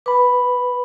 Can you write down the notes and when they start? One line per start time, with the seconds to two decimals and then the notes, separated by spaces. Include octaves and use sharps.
0.06 B4 B5 D6